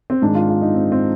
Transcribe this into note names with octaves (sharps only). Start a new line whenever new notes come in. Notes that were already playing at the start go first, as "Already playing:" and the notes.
C4
G#2 D#3 G#3 D4
F4
F4
D#4
C4
C4